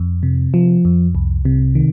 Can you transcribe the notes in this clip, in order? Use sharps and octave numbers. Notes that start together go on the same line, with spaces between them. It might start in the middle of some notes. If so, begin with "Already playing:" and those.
Already playing: F2
C3
F3
F2
C2
C3
D#3